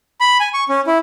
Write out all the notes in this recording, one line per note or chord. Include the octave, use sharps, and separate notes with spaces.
B5
G#5
C#6
C#4
E4